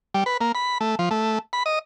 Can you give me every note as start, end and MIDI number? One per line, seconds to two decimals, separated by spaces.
0.14 0.24 55
0.26 0.37 71
0.41 0.52 58
0.55 0.78 83
0.81 0.95 57
0.99 1.09 53
1.11 1.39 57
1.53 1.63 83
1.66 1.79 75